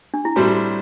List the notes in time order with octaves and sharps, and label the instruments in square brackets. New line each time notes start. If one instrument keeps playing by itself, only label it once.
[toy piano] D4
E4
[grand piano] A2 G3 C4 G4 [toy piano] F#4